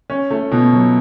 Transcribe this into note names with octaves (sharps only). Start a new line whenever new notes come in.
C#4
A3
B2
F#3